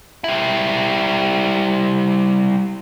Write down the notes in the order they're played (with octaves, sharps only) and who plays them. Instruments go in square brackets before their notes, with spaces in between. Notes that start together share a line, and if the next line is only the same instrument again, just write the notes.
[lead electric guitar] G3 E4